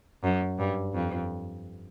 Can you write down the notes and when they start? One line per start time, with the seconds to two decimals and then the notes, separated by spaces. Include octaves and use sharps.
0.24 F#2
0.59 G2
0.94 F2